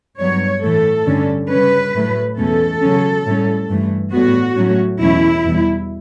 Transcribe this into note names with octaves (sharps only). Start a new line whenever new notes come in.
G2 F#3 B3 C#5
A2 E3 A3 A4
G2 D3 G3 C#4
C#3 G3 C#4 B4
A2 F#3 A3
E2 B2 A3 C#4 A4
C#3 F#3 C#4
A2 G3 C#4
G2 E3 A3
A2 G3 B3 F#4
A2 F#3 A3 C#4
E2 B2 F#3 A3 C#4 E4
E2 B2 G3